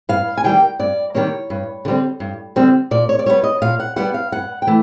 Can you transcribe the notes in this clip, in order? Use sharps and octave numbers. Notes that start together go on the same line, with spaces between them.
G2 F5
G#5
D#3 G3 A#3 G5
G2 D5
D#3 G3 A#3 C#5
G2
D3 G3 C4
G2
D3 G3 C4
A#2 D5
C#5
D5
G3 B3 C#5
D#5
A#2 F5
F#5
G3 B3 F#5
F5
G2 F#5
G5
E3 A3